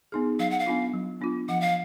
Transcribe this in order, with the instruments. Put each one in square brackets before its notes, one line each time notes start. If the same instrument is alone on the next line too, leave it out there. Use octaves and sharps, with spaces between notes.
[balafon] B3 D#4 G#4
[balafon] F#3 [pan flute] F5
[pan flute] F#5
F5
[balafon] B3 D4 F4
F#3
B3 D4 F4
[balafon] F3 [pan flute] F#5
[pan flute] F5